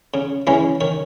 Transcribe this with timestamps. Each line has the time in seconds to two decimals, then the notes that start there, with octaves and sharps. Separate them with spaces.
0.14 C#3
0.47 E3 G#3 C#4 E4
0.81 D#3 C#5